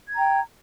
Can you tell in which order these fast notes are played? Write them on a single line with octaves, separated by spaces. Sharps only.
G#6 A#5 G5